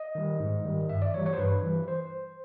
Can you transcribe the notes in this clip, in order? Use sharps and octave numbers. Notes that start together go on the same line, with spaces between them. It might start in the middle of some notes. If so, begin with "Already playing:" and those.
Already playing: D#5
D#3 G3
G#2
D#3 G3
G2 E5
D5
E3 G3 C#5
C#5
C5
G2 B4
E3 G3
C5